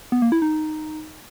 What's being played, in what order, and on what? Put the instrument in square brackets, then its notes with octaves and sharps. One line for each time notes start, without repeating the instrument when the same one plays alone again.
[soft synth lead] B3
A#3
E4
D#4